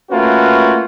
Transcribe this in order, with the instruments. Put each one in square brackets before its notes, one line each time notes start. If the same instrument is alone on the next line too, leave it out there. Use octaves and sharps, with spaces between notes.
[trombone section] A3 A#3 C#4 F4 F#4 B4